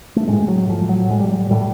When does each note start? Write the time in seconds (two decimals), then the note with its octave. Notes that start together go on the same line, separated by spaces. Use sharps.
0.16 A3
0.27 A2 G#3
0.48 F#3
0.69 A2 F3
0.89 F#3
1.09 A2 G#3
1.20 G3
1.29 F#3
1.39 G3
1.50 A2 G3